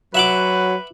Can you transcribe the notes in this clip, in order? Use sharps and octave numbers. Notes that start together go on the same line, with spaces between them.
F#3 B4 E5 F#5 D6